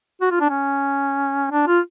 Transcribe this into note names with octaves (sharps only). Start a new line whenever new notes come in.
F#4
F4
D4
C#4
D4
F4